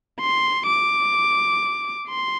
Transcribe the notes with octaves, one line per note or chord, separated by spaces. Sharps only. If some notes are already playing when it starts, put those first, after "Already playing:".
C6
D6
C6